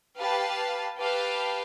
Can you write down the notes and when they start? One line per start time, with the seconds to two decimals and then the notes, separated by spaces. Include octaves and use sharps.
0.19 G4 B4 F5 A5
1.00 G4 B4 F5 A5